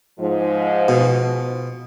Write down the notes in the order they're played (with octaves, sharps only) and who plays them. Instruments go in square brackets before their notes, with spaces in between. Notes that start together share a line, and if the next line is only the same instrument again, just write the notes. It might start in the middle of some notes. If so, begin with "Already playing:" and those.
[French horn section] G#2 F3
[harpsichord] B2